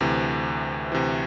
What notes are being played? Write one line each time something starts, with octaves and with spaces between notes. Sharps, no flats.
D2 C3 E3
D2 C3 E3